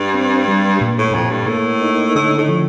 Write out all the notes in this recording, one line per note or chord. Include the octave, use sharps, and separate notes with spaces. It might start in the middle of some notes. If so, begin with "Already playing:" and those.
Already playing: G2
C4
G3
A#2
A2
F2 A#2
G2
A2 A#3
D#4
A2 D3
A2
F3